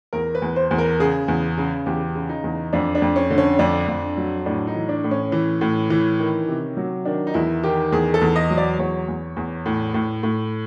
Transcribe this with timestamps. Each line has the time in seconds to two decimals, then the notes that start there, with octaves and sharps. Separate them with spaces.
0.13 E2 A#4
0.35 B4
0.42 E2
0.56 C5
0.71 E2
0.78 A#4
0.99 C#3 G#4
1.28 E2
1.57 C#3
1.86 E2 G4
2.15 C#3
2.29 D#4
2.44 E2
2.73 F2 D4
2.95 D4
3.02 F2
3.16 C#4
3.30 D3
3.38 C#4
3.59 F2 D4
3.88 F2
4.17 F#3
4.46 A2 D4
4.67 D#4
4.75 E3
4.89 D4
5.04 A2
5.11 C#4
5.32 E3
5.61 A2
5.90 E3
6.19 D#3
6.48 C3
6.77 F#3
7.05 D#3 D4
7.27 D#4
7.34 E2 E4
7.63 D#3 G4
7.92 E2 G#4
8.14 A4
8.21 E2
8.36 D#5
8.50 F#3
8.57 D5
8.79 E2 C#5
9.08 E2
9.37 E2
9.66 A2
9.94 A2
10.23 A2